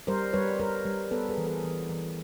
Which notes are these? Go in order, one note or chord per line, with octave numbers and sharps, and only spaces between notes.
G3 A#4 C5
G3 B4 C#5
G3 A#4 C5
G3
B3 A4 B4
G#4 A#4
E3
G#4 A#4
E3
E3